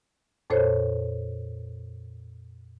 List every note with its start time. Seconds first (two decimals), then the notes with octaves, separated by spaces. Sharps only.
0.50 F2 A#2 A4 C5 C#5